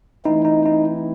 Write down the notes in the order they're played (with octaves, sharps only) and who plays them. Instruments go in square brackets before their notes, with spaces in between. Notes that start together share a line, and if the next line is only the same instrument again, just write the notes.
[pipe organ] E3 A3 C4 E4 [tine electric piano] D#4
[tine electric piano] D#4
D#4